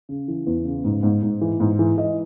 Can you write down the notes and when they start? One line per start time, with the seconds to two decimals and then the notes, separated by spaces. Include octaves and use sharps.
0.09 C#3
0.28 E3
0.47 E2
0.65 C#3
0.85 G#2
1.03 G#2
1.23 G#2
1.41 E3
1.60 G#2
1.79 E3
1.97 E3 D#5